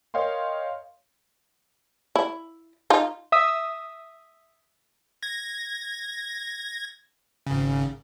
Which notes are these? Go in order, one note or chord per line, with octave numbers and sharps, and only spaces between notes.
A#4 C#5 D#5 F5 G5 C6
E4
D#4 F4
E5 D#6 E6
G#6 A#6
G#1 C#3